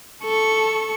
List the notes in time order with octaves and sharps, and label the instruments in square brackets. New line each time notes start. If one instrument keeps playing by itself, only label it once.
[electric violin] A4 C#6